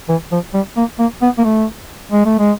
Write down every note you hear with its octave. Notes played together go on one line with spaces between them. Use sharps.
E3
F3
G3
A#3
A#3
B3
A#3
A3
G#3
A3
G#3